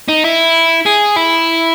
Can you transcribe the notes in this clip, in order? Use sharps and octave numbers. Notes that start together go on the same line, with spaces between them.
D#4
E4
G#4
E4